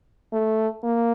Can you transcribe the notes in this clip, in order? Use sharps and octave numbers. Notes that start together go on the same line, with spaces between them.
A3
A#3